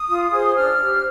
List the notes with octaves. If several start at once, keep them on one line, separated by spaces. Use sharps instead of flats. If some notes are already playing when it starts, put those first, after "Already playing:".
Already playing: D#6
F4
G#4 C5
D4 F6
G4 C5